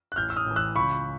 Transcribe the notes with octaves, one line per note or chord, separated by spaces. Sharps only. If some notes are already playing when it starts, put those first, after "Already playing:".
F#6
A1 F6 G6
E6
D#6 F6
A2 E3
E6 F#6
C#2 B5 C#6